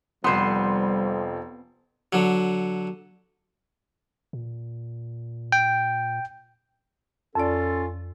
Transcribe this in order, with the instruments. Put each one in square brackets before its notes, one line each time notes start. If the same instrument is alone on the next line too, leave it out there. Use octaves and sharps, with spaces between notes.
[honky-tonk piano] F1 C6 [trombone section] F2 [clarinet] G3 [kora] B3 C5
[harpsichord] D3 F#3
[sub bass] A#2
[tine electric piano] G5
[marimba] F2 D5 [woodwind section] C#4 F4 A4